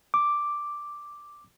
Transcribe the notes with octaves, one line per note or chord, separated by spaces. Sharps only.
D6